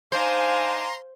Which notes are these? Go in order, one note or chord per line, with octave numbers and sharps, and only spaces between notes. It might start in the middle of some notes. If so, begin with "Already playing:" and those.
G#2 D4 D#4 C5 F5 G#5 A#5 C6